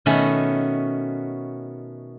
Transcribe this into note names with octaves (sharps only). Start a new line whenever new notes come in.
B2 D#3 A3 B3 C#4 F#4